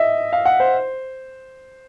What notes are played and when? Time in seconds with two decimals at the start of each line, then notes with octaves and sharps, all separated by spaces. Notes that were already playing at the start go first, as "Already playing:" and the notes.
Already playing: D#5 E5
0.33 F5
0.46 F#5
0.60 C5